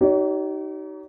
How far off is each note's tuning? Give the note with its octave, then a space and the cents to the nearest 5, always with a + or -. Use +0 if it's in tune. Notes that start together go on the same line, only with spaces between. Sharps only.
D#4 +5 G4 -45 C#5 +40